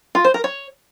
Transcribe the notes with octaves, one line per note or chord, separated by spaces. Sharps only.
F4
C5
A#4
C#5